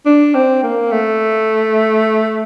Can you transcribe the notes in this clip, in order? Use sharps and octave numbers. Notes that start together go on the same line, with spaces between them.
D4
C4
A#3
A3